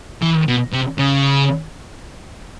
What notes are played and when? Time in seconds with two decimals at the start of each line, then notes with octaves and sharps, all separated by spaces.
0.22 E3
0.47 B2
0.72 C3
0.98 C#3